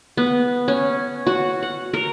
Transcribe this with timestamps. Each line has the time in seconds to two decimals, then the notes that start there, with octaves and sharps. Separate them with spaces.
0.17 B3
0.68 C#4
1.27 F#4
1.62 F#5
1.93 A#4